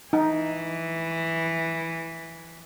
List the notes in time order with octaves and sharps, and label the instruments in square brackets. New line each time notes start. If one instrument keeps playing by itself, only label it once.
[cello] E3 [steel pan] D#4